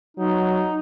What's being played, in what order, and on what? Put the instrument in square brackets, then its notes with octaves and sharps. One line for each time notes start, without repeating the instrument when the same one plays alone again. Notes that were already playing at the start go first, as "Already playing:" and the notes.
[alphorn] F#3 [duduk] D#4